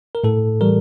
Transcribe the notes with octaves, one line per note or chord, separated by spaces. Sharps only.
A#4
A2 A4
E3 G3 A#4